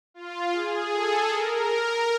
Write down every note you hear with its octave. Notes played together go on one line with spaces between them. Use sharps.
F4
G#4
A4
A#4